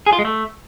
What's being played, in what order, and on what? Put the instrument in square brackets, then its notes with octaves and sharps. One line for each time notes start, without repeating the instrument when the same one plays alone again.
[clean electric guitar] G#4
F4
G#3
A3